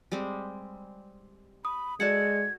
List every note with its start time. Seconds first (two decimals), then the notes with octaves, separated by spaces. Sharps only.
0.12 G3 G#3 C4
1.65 B5 D#6
2.00 G#3 F#4 A4 D5 F#5 G#6 C#7